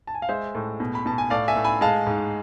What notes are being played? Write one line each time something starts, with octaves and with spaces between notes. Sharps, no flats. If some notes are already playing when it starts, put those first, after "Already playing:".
A5
G#5
F5
G#3 C5 E5
A2
B2
B5
B2 A5
G#5
A2 D5 F5
E5 G#5
A2
G#5 B5
G#3 F5 A5
G#2